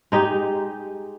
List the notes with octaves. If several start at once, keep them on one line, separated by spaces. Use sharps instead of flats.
G#3 D#4 G4